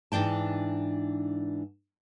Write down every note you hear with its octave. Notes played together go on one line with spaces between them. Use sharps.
G#2 E3 D4 G5 A5